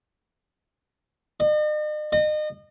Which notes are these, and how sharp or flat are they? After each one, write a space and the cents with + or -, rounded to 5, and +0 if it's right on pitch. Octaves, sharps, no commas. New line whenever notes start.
D#5 -45
D#5 -35